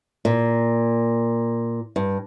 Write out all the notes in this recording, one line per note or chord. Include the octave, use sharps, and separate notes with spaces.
A#2
G2